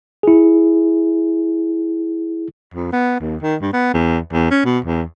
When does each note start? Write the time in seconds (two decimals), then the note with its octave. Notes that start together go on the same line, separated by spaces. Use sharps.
0.23 E4 G#4
2.74 F2
2.92 B3
3.20 D#2
3.42 D#3
3.61 G2
3.73 B3
3.94 E2
4.33 E2
4.51 C#4
4.65 B2
4.85 E2